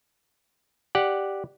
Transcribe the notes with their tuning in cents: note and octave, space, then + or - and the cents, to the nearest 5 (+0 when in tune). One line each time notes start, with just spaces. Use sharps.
G4 +0 D5 +0 F#5 +0